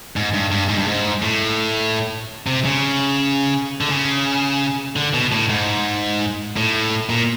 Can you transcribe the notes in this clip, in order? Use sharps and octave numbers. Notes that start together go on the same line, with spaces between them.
G#2
G2
G2
G#2
G2
G#2
A2
C3
C#3
D3
C#3
D3
B2
A2
G#2
A2
A#2